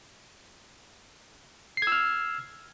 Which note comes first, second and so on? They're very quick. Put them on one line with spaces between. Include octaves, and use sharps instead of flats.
C7 G#6 E6 F6